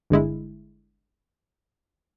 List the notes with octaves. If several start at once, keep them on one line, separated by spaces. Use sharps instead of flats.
G1 D3 G#3 E4